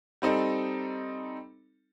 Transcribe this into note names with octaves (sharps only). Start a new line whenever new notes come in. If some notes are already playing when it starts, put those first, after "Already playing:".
G3 C4 D#4 A4